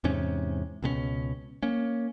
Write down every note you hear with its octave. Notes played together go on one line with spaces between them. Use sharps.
E2 G#2 C3 C#4
C#2 B2 G#3 C#4
A#3 C#4